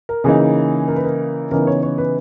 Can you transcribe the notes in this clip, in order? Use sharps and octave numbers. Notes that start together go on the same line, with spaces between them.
A#4
C#3 E3 A#3 D#4 G#4
A#4
B4
A#4
C#3 E3 B3 D#4 A#4
C#5
C#5
B4